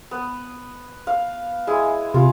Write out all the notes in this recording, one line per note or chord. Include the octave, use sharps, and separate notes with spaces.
B3
F5
G#3 E4 G#4
C3 F4